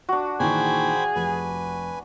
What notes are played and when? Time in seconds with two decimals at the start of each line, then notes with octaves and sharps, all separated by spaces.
0.09 D4 F#4
0.40 A#2 D#3 E3 G#4 C5 G5 B5
1.15 F1 B4 G#5